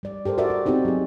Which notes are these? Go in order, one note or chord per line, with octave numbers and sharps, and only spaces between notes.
G3 D5
G4 A4 A#4 C5
F#4 A#4 C5 D5 E5
F#4
B3 C4 D#4 F#4 G4
F#3 G#4